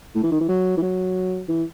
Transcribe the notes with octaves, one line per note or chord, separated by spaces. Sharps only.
A2
E3
D#3
E3
F#3
E3
F#3
E3